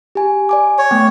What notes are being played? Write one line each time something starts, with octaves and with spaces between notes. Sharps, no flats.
G4 G#5
D5 G#5 D6
C#5
A3 B3 G5